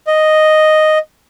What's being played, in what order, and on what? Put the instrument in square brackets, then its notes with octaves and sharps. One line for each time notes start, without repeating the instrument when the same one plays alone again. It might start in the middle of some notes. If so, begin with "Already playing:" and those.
[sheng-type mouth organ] D#5